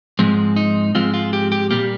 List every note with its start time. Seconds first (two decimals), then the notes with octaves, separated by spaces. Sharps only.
0.19 G#2 F3 G#3 C4
0.56 D#4
0.95 G#2 F3 G#3 C4 F4
1.14 F4
1.33 G4
1.52 G4
1.70 A#2 G3 A#3 G4